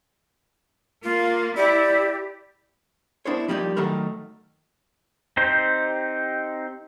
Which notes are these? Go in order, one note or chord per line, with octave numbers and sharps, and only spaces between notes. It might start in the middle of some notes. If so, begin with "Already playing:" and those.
A#3 F4
E4 G4 D5
B3 D4 E4 A#4 C5 C#5
F3 G3 A#3 C#4 D#4
D#3 F#3 A3 D#4 A#4 B5
C4 D#4 G4 C5